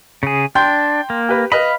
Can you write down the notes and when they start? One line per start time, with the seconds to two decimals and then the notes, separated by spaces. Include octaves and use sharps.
0.23 C#3 G#4
0.55 D4 G5 C6 G6
1.10 A#3
1.29 G4 B4
1.52 B4 D#5 F5 B5